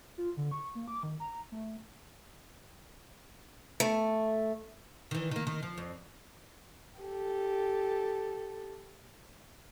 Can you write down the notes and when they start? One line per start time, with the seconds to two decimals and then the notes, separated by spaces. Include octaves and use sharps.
0.18 F4
0.37 D3
0.51 C#6
0.75 A#3
0.88 D6
1.03 D#3
1.20 A#5
1.52 A3
3.80 A3
5.11 D#3 E3
5.31 D#3 A#3
5.47 D#3
5.63 F3
5.78 F2
7.01 G4 A4